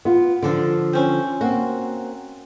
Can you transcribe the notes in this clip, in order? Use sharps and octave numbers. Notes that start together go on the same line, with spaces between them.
B3 F4
D3 F3 D4 A4 D5
C4 C#4 C5
A#3 C4 F#4